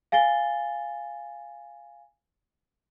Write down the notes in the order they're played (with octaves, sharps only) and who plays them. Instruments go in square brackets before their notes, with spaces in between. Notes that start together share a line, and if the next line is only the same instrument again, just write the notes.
[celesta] F5 G#5 A6 C7 G7